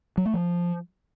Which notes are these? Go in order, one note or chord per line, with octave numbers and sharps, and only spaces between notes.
F#3
A3
F3